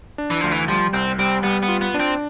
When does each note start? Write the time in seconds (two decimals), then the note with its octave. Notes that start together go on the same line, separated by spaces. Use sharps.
0.18 D4
0.30 E3
0.41 D2 F3
0.52 E3
0.68 F3 G3
0.93 C2 C4
1.19 G3 C4
1.43 G3 B3
1.63 B3
1.68 F4
1.81 B3
1.94 D4
2.00 C4